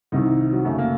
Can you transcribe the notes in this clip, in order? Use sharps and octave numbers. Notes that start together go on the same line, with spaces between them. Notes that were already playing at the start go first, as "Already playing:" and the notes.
C2 C3 D#3 D#4
F#3
F#2 C#3 A3
A#3